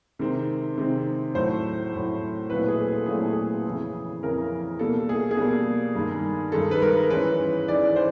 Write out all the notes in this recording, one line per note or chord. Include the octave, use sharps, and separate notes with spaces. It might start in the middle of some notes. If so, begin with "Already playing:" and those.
C3 D#3 G#3 C4
C3 D#3 G#3 C4
A2 F#3 A3 C5
A2 F#3 A3
A#2 F#3 A3 C4 E4 B4
G#4
A4
A4
A#2 F#3 A3 C4 E4 G#4
G#4
F2 C#3 E3
F2 C#3 E3 A#4
B2 G3 A#3 A4
G#4
G#4
B2 G3 A#3
G2 D#3 G#3
G2 D#3 G#3 A4
B4
A#4
G#2 E3 G#3 C#4 B4
G#2 E3 G#3 C#4 D5
C5